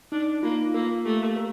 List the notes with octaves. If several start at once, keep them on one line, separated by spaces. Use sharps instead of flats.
D4 D#4
A#3 F4
A#3 A#4
A3 G4
A#4